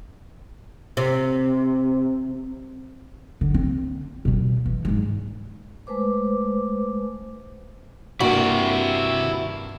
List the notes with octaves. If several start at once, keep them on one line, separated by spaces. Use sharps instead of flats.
C3
D3
C4
B2 G3
E3
G#2 G#3
G#3 A3 B4 C5 D6
G2 C3 A#3 E4 F#4 G4 G5